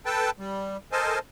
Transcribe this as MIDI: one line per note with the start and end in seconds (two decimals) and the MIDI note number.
0.06 0.30 69
0.06 0.30 71
0.06 0.30 79
0.06 0.30 81
0.39 0.77 55
0.92 1.19 69
0.92 1.19 70
0.92 1.19 72
0.92 1.19 75
0.92 1.19 80
0.92 1.19 81